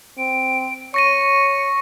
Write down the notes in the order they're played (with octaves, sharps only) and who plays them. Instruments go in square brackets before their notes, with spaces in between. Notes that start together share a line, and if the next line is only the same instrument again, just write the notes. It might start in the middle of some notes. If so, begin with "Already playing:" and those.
[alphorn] C4 [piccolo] D7
[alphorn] C#5 [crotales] C#6 A#6 D#7 [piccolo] C#7